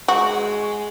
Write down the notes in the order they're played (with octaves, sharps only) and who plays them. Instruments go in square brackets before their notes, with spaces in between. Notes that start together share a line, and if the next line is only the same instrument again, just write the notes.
[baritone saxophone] G#3 [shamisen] F#4